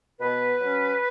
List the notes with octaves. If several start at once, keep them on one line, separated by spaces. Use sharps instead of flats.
B2 B4
F#3 C#4